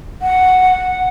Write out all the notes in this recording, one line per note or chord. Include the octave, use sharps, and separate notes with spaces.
F#5